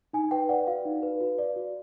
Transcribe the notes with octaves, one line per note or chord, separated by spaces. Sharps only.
D#4 G#5
B4 G5
D5 F#5
F#4 F5
D#4
B4
F#4
D5
F#4